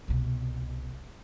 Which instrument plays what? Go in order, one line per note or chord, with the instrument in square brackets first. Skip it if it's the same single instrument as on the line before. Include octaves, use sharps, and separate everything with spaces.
[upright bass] C2 B2